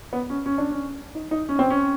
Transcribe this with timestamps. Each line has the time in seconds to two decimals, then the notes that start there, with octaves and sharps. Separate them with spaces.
0.13 B3
0.30 C#4
0.46 C#4
0.58 D4
0.71 C#4
1.15 D#4
1.31 D#4
1.49 C#4
1.59 C4
1.70 C#4